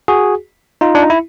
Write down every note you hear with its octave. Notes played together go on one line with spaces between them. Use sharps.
F#4 G#4
D#4 F4
D4
D#4
E4